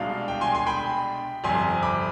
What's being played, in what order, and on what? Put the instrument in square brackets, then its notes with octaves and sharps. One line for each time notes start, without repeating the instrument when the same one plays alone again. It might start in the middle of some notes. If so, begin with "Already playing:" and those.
Already playing: [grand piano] C2 B2 G#3 D4 F5
G5
G#5 C6
G#5 C6
G5 B5
G1 F2 C3 G#5 C6
B5 D6